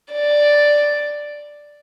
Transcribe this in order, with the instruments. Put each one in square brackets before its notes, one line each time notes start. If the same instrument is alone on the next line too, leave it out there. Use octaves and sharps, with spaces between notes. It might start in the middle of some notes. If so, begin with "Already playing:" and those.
[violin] D5